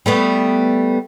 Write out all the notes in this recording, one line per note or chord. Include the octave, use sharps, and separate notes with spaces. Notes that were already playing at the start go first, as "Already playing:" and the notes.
G3 A3 B3